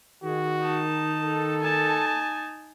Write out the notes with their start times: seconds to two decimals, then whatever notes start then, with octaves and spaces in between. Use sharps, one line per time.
0.24 D#3 F#4 G#4
0.61 D#4 A5
1.21 A4
1.62 D#4 G#5 A5